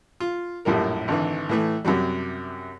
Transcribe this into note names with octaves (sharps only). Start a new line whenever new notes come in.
F4
A#1 F#2 A2 G3 A#4
G#1 D3 E3
A2 E3 A3
F#2 C3 F#3 G3